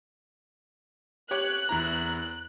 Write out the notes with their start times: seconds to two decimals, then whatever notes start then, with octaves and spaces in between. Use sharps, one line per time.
1.31 G4 C#5 F#6
1.69 E2 E4 A#5